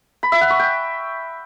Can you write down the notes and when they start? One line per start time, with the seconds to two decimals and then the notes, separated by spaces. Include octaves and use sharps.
0.23 B5
0.32 E5
0.41 F#5
0.50 C#6
0.59 G5